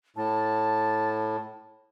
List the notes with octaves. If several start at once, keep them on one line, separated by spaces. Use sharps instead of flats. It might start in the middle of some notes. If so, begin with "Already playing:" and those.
A2 A5